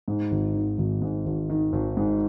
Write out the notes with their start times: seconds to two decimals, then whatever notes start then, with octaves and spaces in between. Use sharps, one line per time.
0.08 G#2
0.31 G#1
0.55 D#3
0.78 G#1
1.02 G#2
1.26 G#1
1.50 D#3
1.73 G#1
1.97 G#2